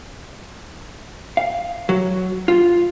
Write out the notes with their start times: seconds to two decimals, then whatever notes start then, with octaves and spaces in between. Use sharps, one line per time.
1.37 F5
1.89 F#3
2.48 F4